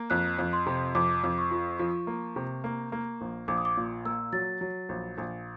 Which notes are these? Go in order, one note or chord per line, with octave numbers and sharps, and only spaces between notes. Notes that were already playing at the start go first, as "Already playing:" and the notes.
Already playing: A#3
F2 F#6
F2
C6
C3
F2 D6
F2
C#6
F3
F3
A#3
C3
A#3
A#3
A#1
A#1 D6
D#6
D6
A#2
A#3 E6
F#3 A6
F#3
A#1
A#1